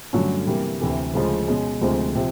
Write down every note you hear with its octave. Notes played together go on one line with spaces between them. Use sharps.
G2 D3 F#3 A3 C#4
C3 E3 G3 A#3
D2 C3 E3 A3
D2 C#3 F3 G#3
B2 G#3 C#4
D2 C3 F3 G#3 C4
C3 F3